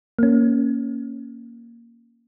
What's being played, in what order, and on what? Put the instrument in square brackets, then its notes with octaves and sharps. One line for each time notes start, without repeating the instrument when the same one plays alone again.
[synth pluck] A#3 C#4